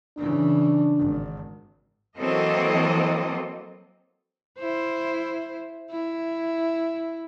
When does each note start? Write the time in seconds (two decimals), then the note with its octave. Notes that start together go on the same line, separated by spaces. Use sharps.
0.17 C#3 E3 D4
0.97 G#1
2.18 E3 F#3 A#3 C4 A4 D#5
4.59 E4 C5
5.91 E4